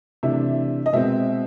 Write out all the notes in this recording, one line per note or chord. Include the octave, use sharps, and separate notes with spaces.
C3 E3 A3 D4 E5
D#5
B2 G#3 C4 E5